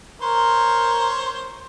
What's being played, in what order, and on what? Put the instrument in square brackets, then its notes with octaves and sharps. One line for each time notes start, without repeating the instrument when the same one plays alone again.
[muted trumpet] A#4 [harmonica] C5 C#5 C6